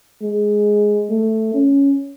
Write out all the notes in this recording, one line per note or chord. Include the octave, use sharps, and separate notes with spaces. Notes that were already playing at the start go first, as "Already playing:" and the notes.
G#3
A3
C#4